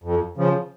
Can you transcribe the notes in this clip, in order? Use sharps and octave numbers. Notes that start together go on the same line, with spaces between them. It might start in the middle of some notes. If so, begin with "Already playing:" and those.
F2
C#3 F3